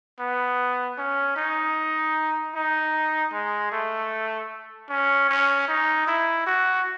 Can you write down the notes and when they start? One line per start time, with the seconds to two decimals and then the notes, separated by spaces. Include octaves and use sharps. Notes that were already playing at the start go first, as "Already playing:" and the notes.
0.19 B3
0.98 C#4
1.36 D#4
2.55 D#4
3.33 G#3
3.72 A3
4.89 C#4
5.29 C#4
5.68 D#4
6.08 E4
6.47 F#4